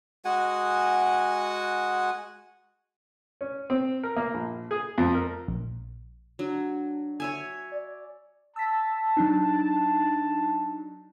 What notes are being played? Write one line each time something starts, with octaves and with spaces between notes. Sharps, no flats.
G#3 F#4 F#5 G#5
C#4
C4
A#4
A#3
A#1
G#4
F2
A#4
A#1
F#3 D4
C#5 E5 G#5
D5
A5 E6 B6
F#3 D4 D#4